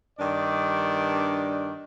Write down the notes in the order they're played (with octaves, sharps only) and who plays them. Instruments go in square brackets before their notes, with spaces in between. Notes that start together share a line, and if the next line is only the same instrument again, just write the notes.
[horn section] G2 D#3 D4 D5